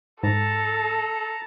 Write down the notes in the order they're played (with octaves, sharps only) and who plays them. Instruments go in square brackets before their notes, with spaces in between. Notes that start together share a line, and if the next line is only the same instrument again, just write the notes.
[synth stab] G#2 [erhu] A4 [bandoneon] A5 A#5